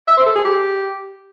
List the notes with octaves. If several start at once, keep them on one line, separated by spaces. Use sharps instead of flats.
E5
C5
A4
G#4
G4